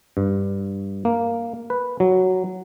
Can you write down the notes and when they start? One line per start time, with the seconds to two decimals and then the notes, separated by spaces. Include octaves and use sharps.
0.17 G2
1.05 A#3
1.70 B4
2.00 F#3